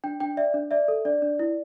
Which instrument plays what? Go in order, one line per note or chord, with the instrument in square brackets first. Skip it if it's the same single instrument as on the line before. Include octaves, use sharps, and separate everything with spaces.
[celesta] D4 G5
D4 G5
D5 E5
D4
D5 E5
A4
D4 D5
D4
E4